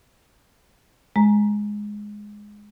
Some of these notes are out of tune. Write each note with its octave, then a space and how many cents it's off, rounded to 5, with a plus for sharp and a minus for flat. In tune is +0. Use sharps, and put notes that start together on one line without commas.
G#3 +0 A#5 +15